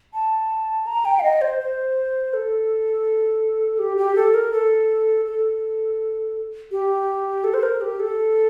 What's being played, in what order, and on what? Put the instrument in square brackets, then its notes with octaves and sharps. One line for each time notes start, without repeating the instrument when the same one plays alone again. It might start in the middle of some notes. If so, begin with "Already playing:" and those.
[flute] A5
A#5
G5
F5
D#5
C5
C5
A4
G4
G4
A4
A#4
A4
A4
G4
A4
C5
A#4
G4
A4